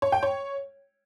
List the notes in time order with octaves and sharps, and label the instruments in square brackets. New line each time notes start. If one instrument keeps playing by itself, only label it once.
[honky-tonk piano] C#5
G5
C#5